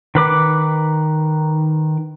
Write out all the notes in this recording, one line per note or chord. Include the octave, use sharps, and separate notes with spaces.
D#3 B4 D6